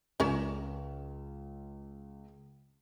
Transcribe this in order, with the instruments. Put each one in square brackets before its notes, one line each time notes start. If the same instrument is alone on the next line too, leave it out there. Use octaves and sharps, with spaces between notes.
[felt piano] C#2 E7 [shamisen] C#4 A#4 D5